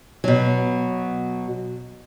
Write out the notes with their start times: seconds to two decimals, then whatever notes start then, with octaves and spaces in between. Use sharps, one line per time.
0.24 B2 F#3